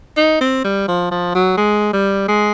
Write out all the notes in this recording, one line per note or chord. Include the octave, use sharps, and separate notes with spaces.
D#4
C4
G3
F3
F3
F#3
G#3
G3
G#3